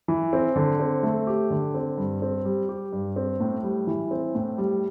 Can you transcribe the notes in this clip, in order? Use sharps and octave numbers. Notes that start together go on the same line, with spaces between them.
E3
C4
D3
C4
A3
G4
D3
C4
G2
C4
G3
G4
G2
C4
A2
G3
E3
C4
A2
G3